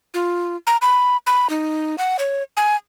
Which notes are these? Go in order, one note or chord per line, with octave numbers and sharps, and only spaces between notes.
F4
A#5
B5
B5
D#4
F#5
C#5
G#5